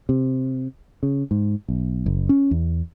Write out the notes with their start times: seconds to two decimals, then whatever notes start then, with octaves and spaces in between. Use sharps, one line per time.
0.09 C3
1.03 C#3
1.31 G#2
1.69 B1
2.06 F#1
2.29 C#4
2.51 E2